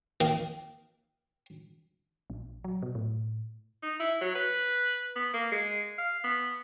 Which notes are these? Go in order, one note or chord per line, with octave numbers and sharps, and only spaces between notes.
D#3 A#3
A#1
F#3
B2
A2
D#4
E4
F#3
B4
B3
A#3
G#3
F5
B3